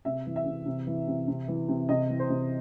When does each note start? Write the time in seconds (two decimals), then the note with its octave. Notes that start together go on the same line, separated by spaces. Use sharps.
0.05 C3 E5
0.26 E3
0.36 E5
0.46 C3
0.66 C3
0.87 E3
1.08 C3
1.28 C3
1.48 E3
1.69 C3
1.89 C3 D#5
2.10 E3
2.19 C5
2.30 C3